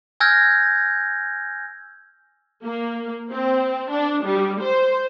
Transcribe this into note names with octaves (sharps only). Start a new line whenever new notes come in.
G#5 E6 F6 G6 G#6 A#6
A#3
C4
D4
G3
C5